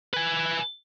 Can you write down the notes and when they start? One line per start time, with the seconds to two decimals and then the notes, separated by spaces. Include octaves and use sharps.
0.13 B4 G#5